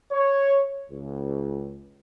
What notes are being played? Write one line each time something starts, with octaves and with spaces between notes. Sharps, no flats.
C#5
C#2